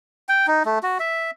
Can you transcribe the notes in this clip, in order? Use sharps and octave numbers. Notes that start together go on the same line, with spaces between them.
G5
D#4
A3
F#4
E5